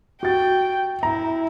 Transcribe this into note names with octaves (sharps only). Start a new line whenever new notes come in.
F#4 G5 A6
E4 A#5